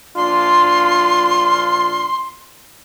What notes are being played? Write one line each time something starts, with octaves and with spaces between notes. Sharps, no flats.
A#1 D4 F4 C6